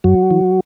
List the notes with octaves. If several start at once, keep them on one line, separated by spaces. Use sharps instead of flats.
F#2 F#3 F#4
E3